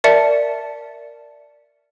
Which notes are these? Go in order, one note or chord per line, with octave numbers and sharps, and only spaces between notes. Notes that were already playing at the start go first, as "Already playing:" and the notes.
A#4 D5 E5 A5 C#7